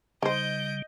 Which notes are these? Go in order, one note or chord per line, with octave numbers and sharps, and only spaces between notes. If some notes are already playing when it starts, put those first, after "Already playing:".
C#3 G3 D#4 C5 D#5 G6